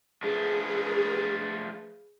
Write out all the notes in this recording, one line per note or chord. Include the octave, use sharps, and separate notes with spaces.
F3 A3 D4 G#4 B4